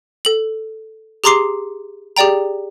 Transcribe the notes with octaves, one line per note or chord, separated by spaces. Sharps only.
A4 F#7
G4 G#4 A#5 C6 D6 C7
G4 G#4 D5 G5 A#5